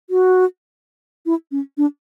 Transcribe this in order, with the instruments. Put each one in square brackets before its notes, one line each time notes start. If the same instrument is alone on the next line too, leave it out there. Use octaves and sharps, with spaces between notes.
[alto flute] F#4
E4
C#4
D4